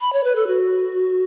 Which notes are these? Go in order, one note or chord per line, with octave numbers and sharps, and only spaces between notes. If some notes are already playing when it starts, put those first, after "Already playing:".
B5
C#5
B4
A4
F#4